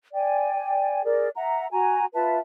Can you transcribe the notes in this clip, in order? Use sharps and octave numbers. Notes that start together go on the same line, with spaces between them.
D5 G5 G#5
G#4 A#4 D5
E5 F#5 A#5
F#4 G#5 A#5
F4 B4 E5 A5